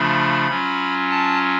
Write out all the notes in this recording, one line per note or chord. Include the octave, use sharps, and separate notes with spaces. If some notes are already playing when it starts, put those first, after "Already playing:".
Already playing: C#3 F3 A3 D4 F4 B5
F#3 C#4 F4
A5